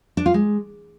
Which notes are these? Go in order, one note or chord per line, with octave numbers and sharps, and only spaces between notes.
D4
F4
G#3